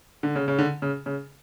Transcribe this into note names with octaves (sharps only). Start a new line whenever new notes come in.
D3
C#3
C#3
D3
C#3
C#3